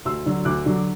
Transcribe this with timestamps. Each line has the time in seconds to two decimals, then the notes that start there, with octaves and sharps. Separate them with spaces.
0.05 D2 C6 E6
0.26 D3 F#3
0.45 D2 D6 F#6
0.66 D3 F#3